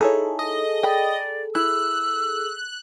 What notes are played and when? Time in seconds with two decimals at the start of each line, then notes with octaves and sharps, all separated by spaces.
0.01 D#4 E4 G#4 A4 C#5
0.39 D#5
0.83 D5 G5 B5
1.55 E4 E6 F#6